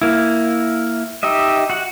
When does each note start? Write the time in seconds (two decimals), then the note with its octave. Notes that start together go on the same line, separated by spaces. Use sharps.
0.02 A#3 E4
1.23 D#4 G4 D#5 E5
1.70 F#4 F#5